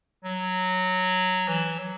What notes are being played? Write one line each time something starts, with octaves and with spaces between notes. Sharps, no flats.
F#3
E3
F#3